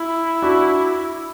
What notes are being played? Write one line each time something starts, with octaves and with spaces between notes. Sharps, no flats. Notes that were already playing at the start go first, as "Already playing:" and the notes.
Already playing: E4
D4 F#4